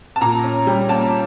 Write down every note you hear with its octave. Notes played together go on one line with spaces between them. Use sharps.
A5
A#2 A#5
C#4
G3
A#3 A5